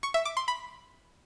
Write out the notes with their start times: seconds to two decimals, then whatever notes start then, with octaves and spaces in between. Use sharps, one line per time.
0.03 C#6
0.14 E5
0.25 D6
0.37 C6
0.48 B5